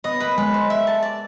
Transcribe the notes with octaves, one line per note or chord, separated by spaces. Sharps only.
B3 D#5
A#3 B4
G#3 B4
C5
E5
A5
D5